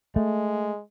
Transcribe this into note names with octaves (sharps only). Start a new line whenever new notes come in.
G#3 A3